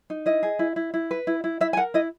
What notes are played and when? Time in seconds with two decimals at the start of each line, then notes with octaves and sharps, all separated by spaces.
0.10 D#4
0.26 E4 D#5
0.43 G#4
0.59 E4
0.76 E4
0.94 E4
1.11 B4
1.27 E4
1.44 E4
1.61 E4 E5
1.73 G#5
1.77 A#4 F#5
1.94 E4 D#5